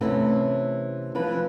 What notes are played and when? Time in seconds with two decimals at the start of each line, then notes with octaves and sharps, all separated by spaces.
0.01 C3 E3 A3 C#4 E4
1.15 E3 F3 B4